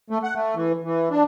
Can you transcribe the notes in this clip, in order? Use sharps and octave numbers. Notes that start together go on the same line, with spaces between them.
A3
F#5
A3
E3
E3
D4